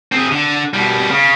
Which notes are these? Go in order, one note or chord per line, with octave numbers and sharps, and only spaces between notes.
C4 G#4
D3
B2 G3
C#3